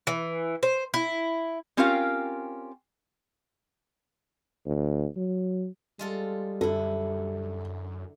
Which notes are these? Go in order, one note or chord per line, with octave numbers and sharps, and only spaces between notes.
E3
C5
E4
C4 C#4 F4 G4 A#4 F5
D2
F#3
G3 G#3 F4 A4
F#2 D3 E4 A4